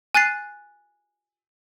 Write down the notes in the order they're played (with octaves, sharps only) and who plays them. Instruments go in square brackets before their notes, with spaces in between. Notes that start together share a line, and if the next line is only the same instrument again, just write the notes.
[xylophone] G#5 F#6 A6 C7